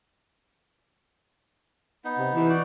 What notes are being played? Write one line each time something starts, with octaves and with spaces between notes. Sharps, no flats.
B3 D#4
C3
E3
D#4 F#4 D5